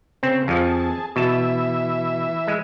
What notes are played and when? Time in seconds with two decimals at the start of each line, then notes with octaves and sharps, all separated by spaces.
0.23 C#3 C4
0.48 F2 F3 G#4 A5
1.16 B2 E3 E5 A5
2.47 G#3